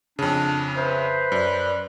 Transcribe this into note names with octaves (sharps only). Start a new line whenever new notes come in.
F2 C#3 D4
B4 C5 E5
F#2 D5